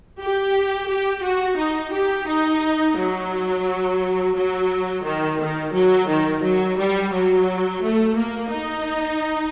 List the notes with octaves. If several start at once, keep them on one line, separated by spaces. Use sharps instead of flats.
G4
G4
F#4
D#4
G4
D#4
F#3
F#3
D#3
D#3
F#3
D#3
F#3
G3
F#3
A3
A#3
D#4